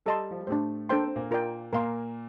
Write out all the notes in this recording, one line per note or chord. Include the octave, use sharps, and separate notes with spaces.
G3 A4 D#5 A5 C6
F3
G3
A2 A3 D4 G4 C5
A#3 D4 A4 C5 G5 C6
C4
A#2 A#3
F4 A#4 D5 G5
A#2 A#3 A#4 F5 C6